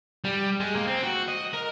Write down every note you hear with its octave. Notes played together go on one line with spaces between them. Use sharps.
G3
G#3
A#3
C4
F#4
D#5
A#4